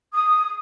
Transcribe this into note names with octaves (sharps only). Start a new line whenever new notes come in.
D#6